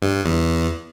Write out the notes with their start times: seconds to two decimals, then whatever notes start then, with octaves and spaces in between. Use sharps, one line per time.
0.02 G2
0.25 E2